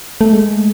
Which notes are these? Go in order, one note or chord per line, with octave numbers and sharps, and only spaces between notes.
A3
G#3